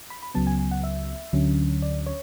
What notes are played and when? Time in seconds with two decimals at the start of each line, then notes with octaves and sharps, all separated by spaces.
0.10 B5
0.22 B5
0.35 C#2 C#3 F#3 B3 A5
0.47 G#5
0.59 G#5
0.71 F#5
0.84 E5
1.33 D2 D3 F#3 C#4
1.82 D5
2.06 C#5